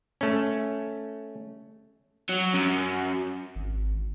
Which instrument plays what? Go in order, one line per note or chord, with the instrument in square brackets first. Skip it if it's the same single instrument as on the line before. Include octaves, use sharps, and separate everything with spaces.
[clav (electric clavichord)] A3 C#4
[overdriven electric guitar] F#3
F#2
[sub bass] G#1